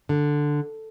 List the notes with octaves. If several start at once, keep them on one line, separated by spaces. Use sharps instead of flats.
D3